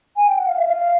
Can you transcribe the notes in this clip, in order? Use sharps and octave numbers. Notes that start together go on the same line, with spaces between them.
G#5
G5
F#5
F5
E5
F5